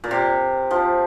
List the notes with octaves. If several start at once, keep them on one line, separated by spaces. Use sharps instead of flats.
A#2
C3
F3